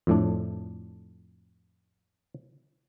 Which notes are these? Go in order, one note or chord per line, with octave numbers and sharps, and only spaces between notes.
F2 A2 D4